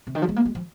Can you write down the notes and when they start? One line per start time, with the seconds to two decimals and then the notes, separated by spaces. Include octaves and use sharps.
0.07 C3
0.15 D#3
0.22 F3
0.29 G#3
0.36 A#3
0.45 G#3
0.55 F3